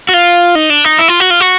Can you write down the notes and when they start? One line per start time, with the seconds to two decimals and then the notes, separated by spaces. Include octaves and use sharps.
0.09 F#4
0.14 F4
0.55 D#4
0.70 D4
0.84 D#4
0.99 E4
1.08 F4
1.20 F#4
1.30 F4
1.40 F#4